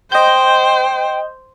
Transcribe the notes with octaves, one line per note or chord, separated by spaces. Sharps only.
C5 D#5 G5 G6